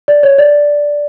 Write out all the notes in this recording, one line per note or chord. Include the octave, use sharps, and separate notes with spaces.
D5
C#5
D5